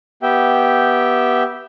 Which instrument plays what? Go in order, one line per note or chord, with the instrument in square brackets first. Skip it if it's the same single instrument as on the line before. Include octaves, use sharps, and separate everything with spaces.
[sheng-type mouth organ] B3 G4 E5 G5